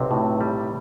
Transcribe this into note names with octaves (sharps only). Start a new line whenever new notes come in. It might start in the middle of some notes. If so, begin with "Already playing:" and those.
Already playing: B1 C3 C4
A2
G3